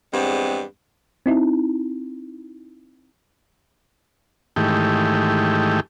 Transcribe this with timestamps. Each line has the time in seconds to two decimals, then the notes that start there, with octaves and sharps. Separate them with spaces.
0.13 E2 G2 G#3 B3 C4 D5
1.26 C4 D#4 E4
4.56 G#2 D#3 E3 A3 G4